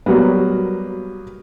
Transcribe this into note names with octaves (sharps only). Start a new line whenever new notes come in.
F#3 G3 A#3 B3